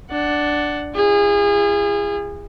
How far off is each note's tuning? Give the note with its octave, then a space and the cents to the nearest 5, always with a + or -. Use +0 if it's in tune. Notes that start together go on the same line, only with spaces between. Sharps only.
D4 +0 F#5 +10
E4 +45 G#4 -30